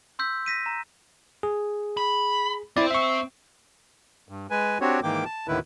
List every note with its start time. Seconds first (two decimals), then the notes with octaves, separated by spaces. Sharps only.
0.19 C6 E6 G6 B6
0.46 A#6 B6 D#7
0.66 A#5
1.43 G#4
1.97 B5
2.77 C4 E4 C5 D5
2.91 E5 C#6
4.29 G2
4.51 G#3 B4 G#5
4.81 C4 D4 F#4 G4 C#5
5.03 G#2 D#3 E3 A#3 G5 D6
5.25 A5
5.48 D#2 A2 D3 D#3 E4 B4